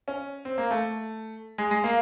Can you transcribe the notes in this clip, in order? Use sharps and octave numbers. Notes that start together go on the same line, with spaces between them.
C#4
C4
A#3
A3
G#3
G#3
A#3